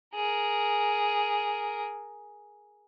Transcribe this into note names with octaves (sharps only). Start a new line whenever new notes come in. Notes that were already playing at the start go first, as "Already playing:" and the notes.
G#4 A#4